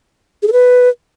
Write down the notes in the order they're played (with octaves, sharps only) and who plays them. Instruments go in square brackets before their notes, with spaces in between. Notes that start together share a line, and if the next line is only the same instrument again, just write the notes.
[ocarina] G#4
A4
B4